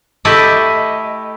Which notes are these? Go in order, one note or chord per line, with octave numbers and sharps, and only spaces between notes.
A3 E4 G4 A4 D#5